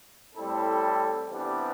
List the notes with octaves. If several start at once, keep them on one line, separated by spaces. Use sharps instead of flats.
A2 G3 C4 E4 A4
C3 E3 G3 B3 D4